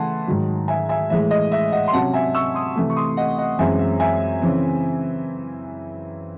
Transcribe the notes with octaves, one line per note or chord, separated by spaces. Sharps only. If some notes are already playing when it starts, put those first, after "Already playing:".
Already playing: C#3 E3 A3 F#5 A5 C6
G#2 D#3 F#3
E5 G#5
E5 G#5
A2 E3 G#3 E5
D#5
E5
D#5 F#5
C6
C3 F#3 C#4 F#5 A5
E5 G#5
C#6 E6
C6 D#6
C3 E3 A3
C#6
C6 D#6
D#5 F#5
D#5 F#5
F#2 E3 G#3 C4 E5 G#5
E5
E5 G#5
C#3 E3 C4